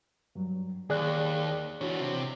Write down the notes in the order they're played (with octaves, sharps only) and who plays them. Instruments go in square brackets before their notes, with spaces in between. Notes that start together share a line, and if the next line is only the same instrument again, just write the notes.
[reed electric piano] G2 F#3
[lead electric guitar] D#2 [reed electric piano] G#4 D5 F#6
[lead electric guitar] E3 D4 [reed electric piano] F#4 C#5
[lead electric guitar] C3